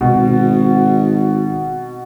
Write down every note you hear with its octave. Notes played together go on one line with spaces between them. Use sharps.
G#1 B2